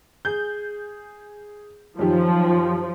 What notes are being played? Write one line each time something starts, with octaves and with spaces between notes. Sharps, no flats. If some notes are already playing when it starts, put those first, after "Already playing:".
G#4 G6
F#2 D#3 F3 G4